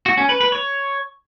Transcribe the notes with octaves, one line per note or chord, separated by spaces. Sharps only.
F#4
C#4
B4
B4
C#5